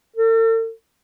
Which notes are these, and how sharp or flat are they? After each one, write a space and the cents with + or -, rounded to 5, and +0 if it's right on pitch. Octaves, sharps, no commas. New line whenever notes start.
A4 +45